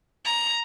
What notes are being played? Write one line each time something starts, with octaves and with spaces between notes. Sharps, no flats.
A#5